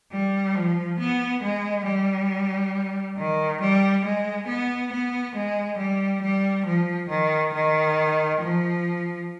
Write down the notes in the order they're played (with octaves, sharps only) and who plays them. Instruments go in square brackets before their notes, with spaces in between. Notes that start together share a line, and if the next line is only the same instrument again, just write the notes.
[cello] G3
F3
B3
G#3
G3
D#3
G3
G#3
B3
B3
G#3
G3
G3
F3
D#3
D#3
F3